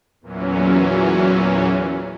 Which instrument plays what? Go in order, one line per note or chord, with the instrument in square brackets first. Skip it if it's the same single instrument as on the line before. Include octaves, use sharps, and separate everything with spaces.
[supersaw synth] E2 A#2 E3 F#3 C#4